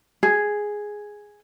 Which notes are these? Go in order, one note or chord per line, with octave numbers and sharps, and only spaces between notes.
G#4